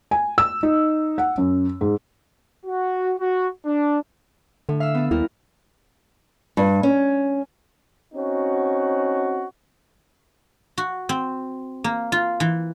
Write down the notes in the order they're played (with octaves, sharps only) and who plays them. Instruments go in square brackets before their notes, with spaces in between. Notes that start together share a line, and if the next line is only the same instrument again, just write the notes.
[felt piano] G#5
E6
D#4
F#5
F#2
G#2
[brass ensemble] F#4
F#4
D4
[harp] A2 [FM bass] D3
[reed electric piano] E5 [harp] F5 E6
[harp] B3 A4
[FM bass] D#2 [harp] G3 A#4 [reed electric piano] E4
[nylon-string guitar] G2
C#4
[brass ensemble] C4 C#4 D#4 F#4
[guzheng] F#4
C4
A#3
F4
E3